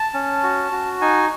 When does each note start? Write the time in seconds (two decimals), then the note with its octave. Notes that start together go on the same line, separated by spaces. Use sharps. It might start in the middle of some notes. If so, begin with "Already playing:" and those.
Already playing: A5
0.14 C#4
0.43 F#4
0.72 F#4
1.01 D#4 G#5